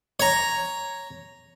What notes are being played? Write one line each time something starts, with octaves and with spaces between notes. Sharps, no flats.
C#5 A#5